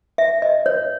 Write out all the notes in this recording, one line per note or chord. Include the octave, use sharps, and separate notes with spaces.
E5
D#5
C#5